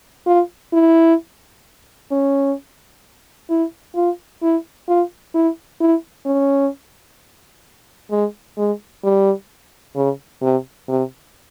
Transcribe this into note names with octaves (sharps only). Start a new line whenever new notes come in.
F4
E4
C#4
E4
F4
E4
F4
E4
E4
C#4
G#3
G#3
G3
C#3
C3
C3